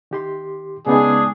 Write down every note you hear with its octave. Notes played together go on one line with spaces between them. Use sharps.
D#3 G4 C6
C#3 G#3 B3 D4 D#4 G#4